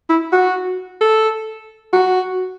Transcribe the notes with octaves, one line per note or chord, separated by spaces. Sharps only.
E4
F#4
A4
F#4